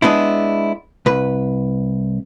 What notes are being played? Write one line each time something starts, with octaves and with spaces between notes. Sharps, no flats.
G#3 B3 D4 E4
C2 B4